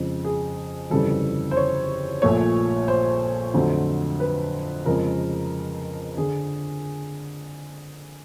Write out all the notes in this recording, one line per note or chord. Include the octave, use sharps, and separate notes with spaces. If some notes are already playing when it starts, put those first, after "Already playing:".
Already playing: F2 C#3 F3 G#3
G#4
G1 F2 C#3 E3 G3 A4
C5
C#5
A#1 A#2 F3 A3 C#5
C5
F2 D3 F#3 A3
B4
F2 C#3 F3 G#3 A#4
D3 G#4